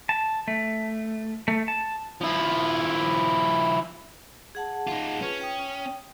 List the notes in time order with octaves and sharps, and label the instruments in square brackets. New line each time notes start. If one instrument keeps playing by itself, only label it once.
[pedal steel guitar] A5
A3
A3
A5
[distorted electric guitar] F3 E4
[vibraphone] G#4 F#5 A5
[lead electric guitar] D#4 F4
[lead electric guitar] C#4 [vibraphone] F4 G#4 B4
[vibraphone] G5 D#6